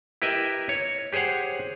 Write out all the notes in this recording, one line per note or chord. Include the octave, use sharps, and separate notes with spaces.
E4 G4 A#4 B4 D#5 E5
C#5
G4 G#4 C5 C#5 F#5